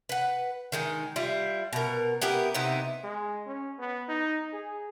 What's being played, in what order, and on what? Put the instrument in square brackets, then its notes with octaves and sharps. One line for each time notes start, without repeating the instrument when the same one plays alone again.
[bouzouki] B4 F#5
D#3 G#3 D#4
G3 E4 F4
B2 A#4
B3 E4 G4 A#4
C3 B3 D#4 E4
[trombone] G#3
C#4
B3
D#4
G#4